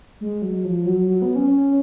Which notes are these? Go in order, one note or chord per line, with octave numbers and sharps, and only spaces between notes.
G#3
F#3
F3
F#3
F#3
B3
C#4
C#4